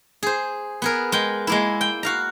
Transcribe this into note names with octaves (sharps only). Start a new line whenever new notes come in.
G#4 C5
B3 G#4 A#4
G#3 G5
G#3 A#3 E4
G5
F#4 F5 A#5